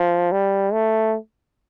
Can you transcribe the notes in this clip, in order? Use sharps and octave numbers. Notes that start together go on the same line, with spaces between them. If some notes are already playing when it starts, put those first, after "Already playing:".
Already playing: F3
G3
A3